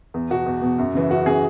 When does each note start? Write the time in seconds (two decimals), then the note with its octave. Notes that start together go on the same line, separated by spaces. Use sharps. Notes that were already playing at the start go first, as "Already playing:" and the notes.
0.14 E2
0.30 B2 F#4
0.46 E2
0.62 B2
0.78 F#2
0.94 C#3 E3
1.10 F#2 F#4
1.26 C#3 E3 G#4